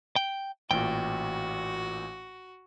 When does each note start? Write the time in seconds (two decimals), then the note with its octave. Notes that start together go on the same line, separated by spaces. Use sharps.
0.16 G5
0.71 A1 A#2 F#4 G5